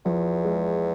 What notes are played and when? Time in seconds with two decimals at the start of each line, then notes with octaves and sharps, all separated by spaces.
0.05 E2 F3
0.45 G#3